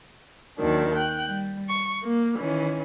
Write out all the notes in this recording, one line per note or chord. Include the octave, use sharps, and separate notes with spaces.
D#2 D#3 F#3 D4
G5 F#6
G3
C#6
A#3
D#3 E3 C#4